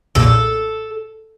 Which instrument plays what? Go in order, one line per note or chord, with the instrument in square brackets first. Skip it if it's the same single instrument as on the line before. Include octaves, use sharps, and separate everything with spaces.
[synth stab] B1 E2 A#2 [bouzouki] A4